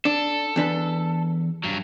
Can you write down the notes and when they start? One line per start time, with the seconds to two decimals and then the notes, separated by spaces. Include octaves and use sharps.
0.05 D4 A4
0.56 E2 D4 B4
1.64 G2 F#3